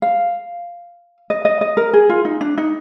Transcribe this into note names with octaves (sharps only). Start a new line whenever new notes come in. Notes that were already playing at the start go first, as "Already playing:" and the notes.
F5
D#5
D#5
D#5
A#4
G#4
F4
D#4
D4
D#4